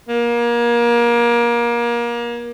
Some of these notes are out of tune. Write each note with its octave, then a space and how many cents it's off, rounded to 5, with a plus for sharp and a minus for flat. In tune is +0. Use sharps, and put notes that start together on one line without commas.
A#3 +30